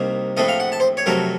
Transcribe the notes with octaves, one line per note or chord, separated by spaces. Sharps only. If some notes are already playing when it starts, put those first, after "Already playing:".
Already playing: C2 C3 D#3 A#3
A#1 A2 A3 C4 D#5
F5
F#5
A5
C5
C#5
F2 C3 F#3 A3 A#4